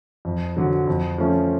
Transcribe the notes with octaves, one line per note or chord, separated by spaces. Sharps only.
F2
D3 F#3
F2
F3 A3 C#4